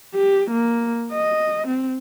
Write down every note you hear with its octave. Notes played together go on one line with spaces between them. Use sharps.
G4
A#3
D#5
C4